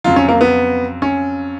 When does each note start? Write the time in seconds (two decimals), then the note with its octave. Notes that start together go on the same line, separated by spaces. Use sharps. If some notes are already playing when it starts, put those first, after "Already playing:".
0.04 F2 C#3 F#3 F4
0.16 C#4
0.28 A#3
0.41 B3
1.02 C#4